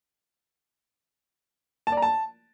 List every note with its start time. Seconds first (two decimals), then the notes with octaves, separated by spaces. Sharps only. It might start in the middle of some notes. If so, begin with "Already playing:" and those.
1.87 A5
1.92 D5
1.97 A#5
2.02 A5